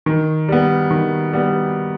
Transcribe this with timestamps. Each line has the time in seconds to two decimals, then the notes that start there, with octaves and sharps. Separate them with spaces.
0.06 D#3
0.48 G3 B3
0.91 D#3
1.33 G3 B3